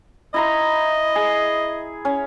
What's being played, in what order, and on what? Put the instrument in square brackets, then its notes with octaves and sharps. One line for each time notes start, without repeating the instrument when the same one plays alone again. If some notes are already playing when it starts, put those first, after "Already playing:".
[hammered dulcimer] E4 A#5 C6 [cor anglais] D#5
[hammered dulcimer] G#4
C#4